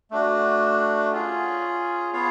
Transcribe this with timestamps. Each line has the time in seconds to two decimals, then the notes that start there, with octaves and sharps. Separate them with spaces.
0.11 A3 D4 F#4
1.12 C#4 F4 G#4
2.13 B3 F4 G#4 C#5 F5